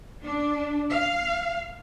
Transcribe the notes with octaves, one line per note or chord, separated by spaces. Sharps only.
D4
F5